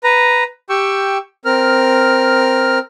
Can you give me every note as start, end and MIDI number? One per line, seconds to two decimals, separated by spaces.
0.04 0.44 71
0.04 0.44 82
0.69 1.18 67
0.69 1.18 79
0.69 1.18 85
0.69 1.18 88
1.45 2.79 60
1.45 2.79 70
1.45 2.79 89